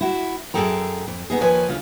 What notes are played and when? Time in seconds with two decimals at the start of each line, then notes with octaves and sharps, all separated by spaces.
0.01 E4 F#4
0.54 F#2 A#2 G#4 A4 G5 A#5
1.08 F2
1.30 B3 D#4 G#4
1.41 D#2 F3 B4 C#5 D#5 G#5
1.68 D2 C#3 F4